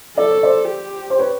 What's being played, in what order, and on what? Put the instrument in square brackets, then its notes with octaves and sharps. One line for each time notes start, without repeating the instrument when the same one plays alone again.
[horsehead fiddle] A4 [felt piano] D5
[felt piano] C#5
C5 D5
[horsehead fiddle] G4
[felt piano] C5
B4 C#5